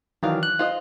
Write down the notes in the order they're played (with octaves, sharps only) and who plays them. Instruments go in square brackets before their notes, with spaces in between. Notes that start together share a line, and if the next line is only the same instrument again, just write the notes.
[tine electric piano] D#3 E3 F#3 [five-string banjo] D4 F5
[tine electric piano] F#6
[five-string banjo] F4 C5 D#5